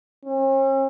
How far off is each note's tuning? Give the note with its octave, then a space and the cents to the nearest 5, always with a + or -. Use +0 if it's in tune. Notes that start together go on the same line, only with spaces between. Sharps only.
C#4 -45